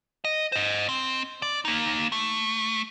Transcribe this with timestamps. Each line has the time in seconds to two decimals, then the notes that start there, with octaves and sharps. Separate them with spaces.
0.25 D#5
0.52 C5 D#5
0.89 C4
1.42 D5
1.65 A#3 D#4
2.12 A3